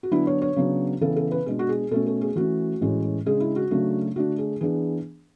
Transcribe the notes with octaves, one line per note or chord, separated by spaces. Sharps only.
F#4
D3 F#3 B3 D4 E4
C#5
C#5
C#3 F#3 B3 D4
C#3 E3 B3 A4
A4
B4
B2 G#3 D4 G#4
F#4
G#4
B2 A3 C#4 A4
A4
G#4
E3 A3 C#4 F#4
A2 E3 G#3 C#4
C#3 G#3 D4 G#4
E4
F#4
C#3 F#3 A3 D4
D3 A3 D4 F#4
G#4
E3 B3 D4 G#4